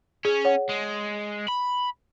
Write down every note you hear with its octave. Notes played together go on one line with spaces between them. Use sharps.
C#4 G#4
C#5 F#5
G#3
B5